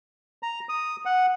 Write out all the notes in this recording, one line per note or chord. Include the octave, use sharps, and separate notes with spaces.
A#5
D#6
F#5